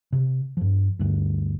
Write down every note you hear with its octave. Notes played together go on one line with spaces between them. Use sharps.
C3
G2 F3
D2 G2